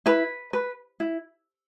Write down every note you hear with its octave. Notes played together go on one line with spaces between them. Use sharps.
E4 B4
B4
E4